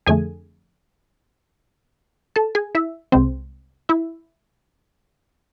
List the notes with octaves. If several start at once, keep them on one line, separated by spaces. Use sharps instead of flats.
F2 D3 A3 G#4 G#5
A4 A5
G#4 G#5
E4 E5
C2 C3 G#3 C4 C5
E4 E5